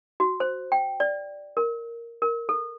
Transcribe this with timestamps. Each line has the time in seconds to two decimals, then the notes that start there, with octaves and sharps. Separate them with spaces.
0.20 F#4
0.40 C5
0.72 G5
1.00 D5
1.57 A#4
2.22 A#4
2.49 A4